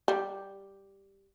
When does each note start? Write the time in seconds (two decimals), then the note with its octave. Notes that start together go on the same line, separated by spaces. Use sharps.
0.08 G3